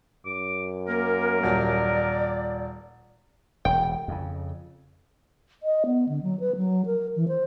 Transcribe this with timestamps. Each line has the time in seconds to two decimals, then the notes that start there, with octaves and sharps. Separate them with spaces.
0.26 F#2 D6
0.88 A#3 A#4
1.43 D#1 D5
3.65 E1 G5
4.08 F2 C#3
5.63 D#5
5.86 B3
6.09 D3
6.23 F#3
6.40 B4
6.56 F#3
6.86 A#4
7.16 E3
7.28 C5